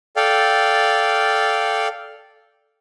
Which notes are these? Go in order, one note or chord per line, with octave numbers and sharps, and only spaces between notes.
A4 D5 F5 G5